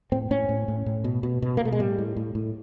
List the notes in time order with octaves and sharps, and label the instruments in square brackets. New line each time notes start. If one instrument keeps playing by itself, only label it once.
[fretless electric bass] A2 C4
A2 C#4
A2
A2
A2
B2
B2
B2
A#3
B2 A3
G#3
A2 G3
A2
A2
A2